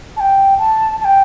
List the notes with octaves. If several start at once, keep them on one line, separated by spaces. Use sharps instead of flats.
A5
G5
A5
A5
G5